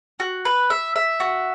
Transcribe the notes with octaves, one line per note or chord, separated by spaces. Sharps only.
F#4
B4
E5
E5
F#4